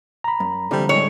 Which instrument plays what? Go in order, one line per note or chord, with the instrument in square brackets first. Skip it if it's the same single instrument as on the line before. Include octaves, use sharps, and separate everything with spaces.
[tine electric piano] A#5 B5
[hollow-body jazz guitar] F#2
[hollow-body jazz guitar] C2 D3 F3 [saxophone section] G3 A3 C4
[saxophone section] A2 G#3 [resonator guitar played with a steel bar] C#5